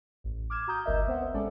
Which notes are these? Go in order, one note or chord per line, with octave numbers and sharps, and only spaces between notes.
A1
D6 F6 G#6 E7
F#4 A#5 D#6 G6
G1 C#2 A#4 D#5 E5
B3 C4 C5 E5 F#5
A1 G#3 C#4 A4 D5